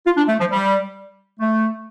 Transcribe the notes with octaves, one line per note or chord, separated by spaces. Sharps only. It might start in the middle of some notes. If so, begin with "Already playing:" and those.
F4
D4
A3
F3
G3
A3